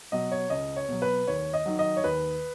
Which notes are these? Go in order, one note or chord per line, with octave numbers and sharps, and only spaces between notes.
B2 F#3 D#5
C#5
C#2 D#5
C#5
B2 F#3
B4
D#2 C#5
D#5
D#3 F#3
D#5
C#5
D#2 B4